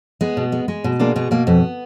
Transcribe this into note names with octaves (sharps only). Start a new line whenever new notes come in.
G#3 B3
B2
G#3
G#3
B2
G#3 A#3 D4
B2 B3
B2 A#3
F2 B3